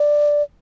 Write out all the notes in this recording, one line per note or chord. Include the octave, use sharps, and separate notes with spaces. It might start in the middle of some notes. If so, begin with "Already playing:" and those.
Already playing: D5